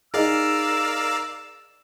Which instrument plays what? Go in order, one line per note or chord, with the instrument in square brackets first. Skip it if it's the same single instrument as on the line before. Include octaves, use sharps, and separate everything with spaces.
[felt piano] D#4 G#4 [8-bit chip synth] A#4 D5 F5 [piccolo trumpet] E6